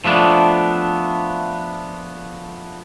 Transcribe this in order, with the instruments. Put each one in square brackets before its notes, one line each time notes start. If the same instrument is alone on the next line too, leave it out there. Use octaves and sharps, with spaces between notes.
[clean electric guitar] F3 A3 B3 D4